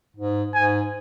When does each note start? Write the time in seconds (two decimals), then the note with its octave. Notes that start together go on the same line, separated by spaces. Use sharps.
0.17 G#2
0.54 G#2 G#5